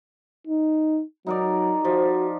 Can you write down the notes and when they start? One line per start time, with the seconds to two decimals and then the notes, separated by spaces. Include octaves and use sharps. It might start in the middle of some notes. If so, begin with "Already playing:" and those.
0.47 D#4
1.26 F#3 D#4 A#4 D5
1.85 F3 F#4